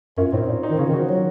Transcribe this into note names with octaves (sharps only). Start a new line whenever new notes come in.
F#2 C#4 F4
A2 C4 D#4
A#2
C4 D#4
D#3
C#3 C#4 F4
D#3
D#4 F#4
F3
F#3